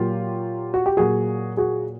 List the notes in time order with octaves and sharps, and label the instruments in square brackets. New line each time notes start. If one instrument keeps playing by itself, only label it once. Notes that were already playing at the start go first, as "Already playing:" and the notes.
Already playing: [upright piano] A#2 F#3 A#3 F4 G4
F#4
G4
A#2 F#3 A#3 F#4 G#4
F#4 G#4